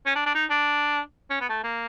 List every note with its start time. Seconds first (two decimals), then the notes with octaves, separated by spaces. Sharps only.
0.06 C#4
0.15 D4
0.26 D4
0.35 D#4
0.50 D4
1.30 C#4
1.41 B3
1.49 A3
1.64 A#3